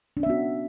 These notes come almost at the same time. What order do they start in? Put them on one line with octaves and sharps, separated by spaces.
D4 C#4 E5 B3 F#4